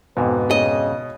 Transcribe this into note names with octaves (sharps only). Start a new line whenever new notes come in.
F2 G#2 B2 D3 B4
C#3 D#5